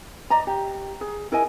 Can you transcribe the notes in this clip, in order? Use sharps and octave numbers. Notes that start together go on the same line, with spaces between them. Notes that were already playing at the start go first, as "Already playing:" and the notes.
D5 D#5 A#5
G4
G#4
E4 A#4 D#5 G#5